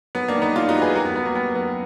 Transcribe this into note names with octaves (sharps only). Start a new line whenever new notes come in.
F#3 B3
A#3 D4
D#3
B3 D#4
F#3 D4 F4
D#4 F#4
D#2
G#4 B4
F#2 F#4 A#4
B3
F#2 B3
A#3
F#2 B3
F#2 B3